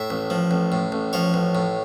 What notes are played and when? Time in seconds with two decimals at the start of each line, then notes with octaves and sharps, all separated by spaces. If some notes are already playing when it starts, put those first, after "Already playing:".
Already playing: A2 E5
0.10 A1
0.30 F3
0.51 A1
0.72 A2
0.92 A1
1.13 F3 C#5
1.34 A1
1.55 A2